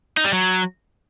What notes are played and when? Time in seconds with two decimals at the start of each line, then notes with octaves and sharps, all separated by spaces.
0.17 D#4
0.25 G3
0.32 F#3